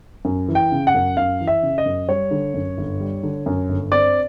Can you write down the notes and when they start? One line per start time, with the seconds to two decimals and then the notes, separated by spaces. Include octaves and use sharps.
0.25 F#2
0.48 E3
0.55 G5
0.72 C#3
0.87 F#5
0.94 F#2
1.17 F#2 F5
1.40 E3
1.47 E5
1.63 C#3
1.78 D#5
1.86 F#2
2.08 G3 C#5
2.31 D3
2.54 F#2
2.77 G1
3.00 G3
3.23 D3
3.46 F#2
3.69 G1
3.91 C4 D5